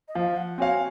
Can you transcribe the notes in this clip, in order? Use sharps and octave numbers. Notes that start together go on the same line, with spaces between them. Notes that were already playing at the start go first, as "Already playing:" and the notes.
D#5
F3 F5
F#5
C4 F#4 C#5 F5 G#5